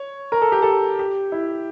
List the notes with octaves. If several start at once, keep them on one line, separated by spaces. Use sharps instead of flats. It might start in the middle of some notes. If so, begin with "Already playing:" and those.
Already playing: C#5
A#4
A4
G4
A4
G4
E4